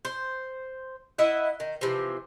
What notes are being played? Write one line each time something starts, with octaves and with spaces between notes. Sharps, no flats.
C5
E4 D#5 E5 F#5
D#3
C3 E3 F3